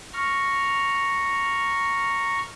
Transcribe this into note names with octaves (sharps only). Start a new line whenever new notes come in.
A#5 C#6 F6